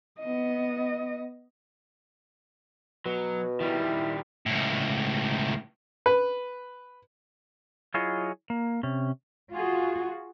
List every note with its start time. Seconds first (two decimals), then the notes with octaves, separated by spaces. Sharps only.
0.20 B3 D#5
3.06 B2 F#3
3.60 D#3 G3 E4
4.46 C#2 A2
6.06 B4
7.94 F#3 E4 F4 G#4 C#5 D#5
8.50 A#3
8.83 C3 C#4
9.53 F4 F#4 G#4